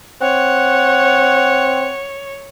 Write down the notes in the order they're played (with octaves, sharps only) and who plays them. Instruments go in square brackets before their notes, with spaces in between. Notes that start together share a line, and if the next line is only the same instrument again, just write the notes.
[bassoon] C4 [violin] C#5 [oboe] F#5